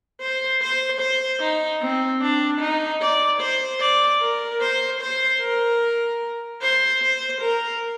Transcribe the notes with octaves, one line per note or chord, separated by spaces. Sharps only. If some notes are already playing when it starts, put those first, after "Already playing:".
C5
C5
C5
D#4
C4
D4
D#4
D5
C5
D5
A#4
C5
C5
A#4
C5
C5
A#4